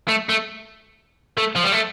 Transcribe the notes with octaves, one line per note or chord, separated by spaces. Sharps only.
A3
A3
A3
F3
G3
A3